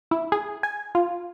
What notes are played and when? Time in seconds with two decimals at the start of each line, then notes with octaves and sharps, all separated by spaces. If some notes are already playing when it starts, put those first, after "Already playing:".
0.11 E4
0.32 G#4
0.63 G#5
0.95 F4